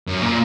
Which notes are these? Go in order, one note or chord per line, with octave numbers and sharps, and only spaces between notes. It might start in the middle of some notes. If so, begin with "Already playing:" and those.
F#2
A#2